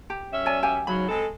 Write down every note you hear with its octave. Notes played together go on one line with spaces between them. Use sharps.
G4
F#2 C#4 E5
C#5 D5 G#5
G4 F5 G#5
G#2 C#3 F#3 B5
G#3 C4 A4